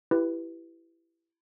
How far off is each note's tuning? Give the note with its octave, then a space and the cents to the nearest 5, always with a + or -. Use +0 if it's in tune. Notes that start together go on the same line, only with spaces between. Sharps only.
E4 +20 G4 +0 B4 +0